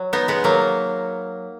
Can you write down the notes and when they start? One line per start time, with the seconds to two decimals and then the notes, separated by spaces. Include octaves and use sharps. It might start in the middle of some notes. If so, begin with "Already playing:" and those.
Already playing: F#3
0.13 B3 D#4
0.28 G#3 B3
0.44 F#3 A#3